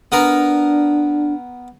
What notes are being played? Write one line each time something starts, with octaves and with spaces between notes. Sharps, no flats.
B3 D4 A#4